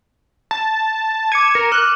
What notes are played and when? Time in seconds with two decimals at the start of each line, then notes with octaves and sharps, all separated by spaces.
0.51 A5
1.32 D6 G#6 C#7 D#7
1.55 A#4 C#7
1.72 F6 F#6